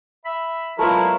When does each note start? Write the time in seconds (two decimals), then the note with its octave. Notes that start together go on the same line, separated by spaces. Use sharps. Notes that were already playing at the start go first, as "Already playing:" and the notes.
0.25 E5 B5
0.79 F#3 G#3 A3 B3 E4 F4 A#4